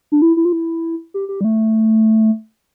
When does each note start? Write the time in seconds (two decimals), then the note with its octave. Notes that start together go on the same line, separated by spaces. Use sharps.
0.12 D4
0.22 E4
0.37 E4
0.45 F4
0.52 E4
1.14 G4
1.29 G4
1.41 G3
1.44 A3